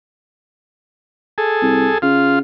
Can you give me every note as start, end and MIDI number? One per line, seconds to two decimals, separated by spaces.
1.38 1.98 68
1.38 1.98 69
1.62 1.88 36
2.02 2.40 49
2.02 2.39 65